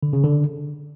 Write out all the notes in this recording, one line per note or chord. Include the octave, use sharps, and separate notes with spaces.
D3
C#3
D3